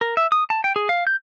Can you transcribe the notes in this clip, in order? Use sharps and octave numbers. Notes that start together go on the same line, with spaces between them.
A#4
E5
D#6
A5
G5
G#4
F5
G6